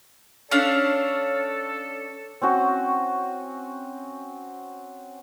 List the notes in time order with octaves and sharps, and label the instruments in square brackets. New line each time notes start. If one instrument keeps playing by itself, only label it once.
[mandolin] C#4 D4 F5 [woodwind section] A4 [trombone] C#5
[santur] C4 C#4 F#4